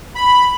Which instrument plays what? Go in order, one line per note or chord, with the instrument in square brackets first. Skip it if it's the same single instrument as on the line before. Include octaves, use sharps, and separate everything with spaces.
[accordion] B5